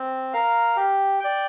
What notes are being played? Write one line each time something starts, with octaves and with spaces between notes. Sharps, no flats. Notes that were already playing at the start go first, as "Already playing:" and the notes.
Already playing: C4
A#4 F5
G4
D5 G5